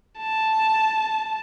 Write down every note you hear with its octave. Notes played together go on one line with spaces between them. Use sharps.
A5